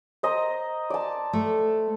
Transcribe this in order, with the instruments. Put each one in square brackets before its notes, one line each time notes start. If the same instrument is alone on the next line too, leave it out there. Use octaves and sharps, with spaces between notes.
[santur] C5 D#5 A#5
D5 A5
[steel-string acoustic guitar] A3